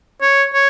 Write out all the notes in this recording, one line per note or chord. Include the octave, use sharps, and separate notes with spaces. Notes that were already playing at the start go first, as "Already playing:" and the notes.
C#5
C#5